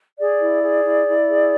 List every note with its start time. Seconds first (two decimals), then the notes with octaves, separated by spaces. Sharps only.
0.19 G#4 D5
0.41 E4
0.62 G#4
0.84 E4
1.06 E4
1.27 G#4